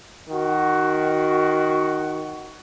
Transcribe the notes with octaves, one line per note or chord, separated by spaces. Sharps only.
D#3 F#4